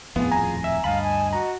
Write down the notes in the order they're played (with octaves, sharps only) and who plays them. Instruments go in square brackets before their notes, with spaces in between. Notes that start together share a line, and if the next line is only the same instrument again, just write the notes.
[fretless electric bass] D#1 F2 A2 [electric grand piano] B3 [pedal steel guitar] F4 G#4
[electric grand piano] G#5 A#5
[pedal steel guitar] E5
[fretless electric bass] D2 G2 [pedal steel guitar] D#5 A5 B5 [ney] F5
[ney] G#5
[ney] F#4 [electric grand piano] A#5